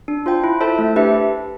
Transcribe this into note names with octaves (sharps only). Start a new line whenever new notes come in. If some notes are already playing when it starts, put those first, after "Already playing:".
D4
F4 C5 G5
E4
A4 C5 E5 A5
A3
D4 G4 B4 E5